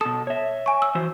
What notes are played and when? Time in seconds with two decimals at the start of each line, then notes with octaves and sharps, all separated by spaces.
0.01 B2 A4 D#6
0.27 C#5 E5
0.66 G#5 C#6
0.82 E6
0.95 E3 F#4 C5